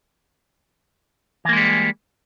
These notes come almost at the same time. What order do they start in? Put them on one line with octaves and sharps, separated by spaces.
E3 A#3 G#3 G3